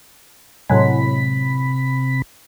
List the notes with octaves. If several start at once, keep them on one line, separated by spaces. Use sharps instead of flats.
A2 C3 F#3 G#3 B5